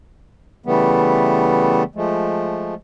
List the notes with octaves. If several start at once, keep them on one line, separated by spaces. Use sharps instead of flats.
C#3 E3 G3 A3 B3
F3 G#3 A3